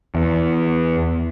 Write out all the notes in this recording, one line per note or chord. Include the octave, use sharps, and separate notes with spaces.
E2